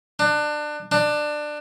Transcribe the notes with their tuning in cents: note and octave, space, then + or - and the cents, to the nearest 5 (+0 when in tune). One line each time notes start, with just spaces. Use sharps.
D4 +25
D4 +20